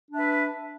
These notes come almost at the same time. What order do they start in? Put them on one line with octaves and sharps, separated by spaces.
D4 E5 B4